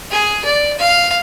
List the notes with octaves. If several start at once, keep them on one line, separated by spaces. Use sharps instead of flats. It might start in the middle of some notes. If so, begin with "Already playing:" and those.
G#4
D5
F5